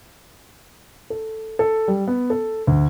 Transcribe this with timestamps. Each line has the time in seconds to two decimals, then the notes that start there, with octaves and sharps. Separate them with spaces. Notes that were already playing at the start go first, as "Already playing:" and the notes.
1.10 A4
1.59 A4
1.88 G3
2.08 B3
2.30 A4
2.67 D2